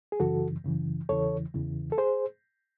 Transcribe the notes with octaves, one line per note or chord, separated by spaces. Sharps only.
G#4
F#2 C#3 E3 F#4 A4
F#2 C#3 E3
E2 C#3 E3 A4 C#5
E2 C#3 E3
A4
G#4 C5